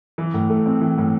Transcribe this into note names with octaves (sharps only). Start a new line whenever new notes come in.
E3
A2
A3
C4
E3
A2